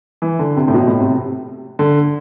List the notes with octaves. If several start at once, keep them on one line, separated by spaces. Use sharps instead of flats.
E3
D3
C3
A2
B2
A2
C3
D3